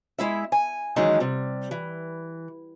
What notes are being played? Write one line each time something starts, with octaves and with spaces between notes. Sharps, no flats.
G#3 E4 E5
G#5
D#3 E3 F#3 G#3 C#4 D#4
C3 G3
E3